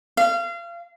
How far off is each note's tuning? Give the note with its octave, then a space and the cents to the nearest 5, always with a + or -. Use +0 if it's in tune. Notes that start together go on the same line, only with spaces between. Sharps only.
F5 -30